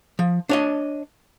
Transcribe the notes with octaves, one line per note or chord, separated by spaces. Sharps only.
F3
D4 C#5 D#5